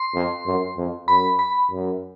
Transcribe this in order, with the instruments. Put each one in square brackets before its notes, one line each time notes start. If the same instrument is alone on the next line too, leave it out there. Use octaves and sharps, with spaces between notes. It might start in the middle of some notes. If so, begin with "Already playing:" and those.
Already playing: [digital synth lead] C6
[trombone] F2
F#2
F2
[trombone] F#2 [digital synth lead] B5
[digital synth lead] B5
[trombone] F#2